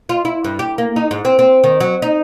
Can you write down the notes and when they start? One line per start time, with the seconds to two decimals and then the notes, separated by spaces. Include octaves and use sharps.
0.09 F4
0.25 E4
0.44 G2
0.59 G4
0.78 A#3
0.96 D#4
1.11 G#2
1.25 C4
1.39 C4
1.64 D#3
1.80 F#3
2.02 D#4